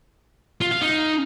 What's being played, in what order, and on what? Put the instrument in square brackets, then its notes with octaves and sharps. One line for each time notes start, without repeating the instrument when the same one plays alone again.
[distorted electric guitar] F4
F5
D#4